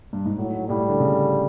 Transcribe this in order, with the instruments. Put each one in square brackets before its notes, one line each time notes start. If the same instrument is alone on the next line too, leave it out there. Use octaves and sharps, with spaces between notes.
[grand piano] G2
G#2
[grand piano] A2 [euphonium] F#3
[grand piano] A2 [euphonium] G3
[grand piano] D3
C#3